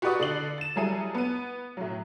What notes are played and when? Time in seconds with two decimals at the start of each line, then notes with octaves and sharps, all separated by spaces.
0.02 F#4 G4 B4 D5 C#6 D#6
0.20 D3 D5 F#7
0.58 A6 E7
0.76 F#3 G3 E4 G#4 A4 D#7
1.15 B3 D#7
1.77 A2 F#3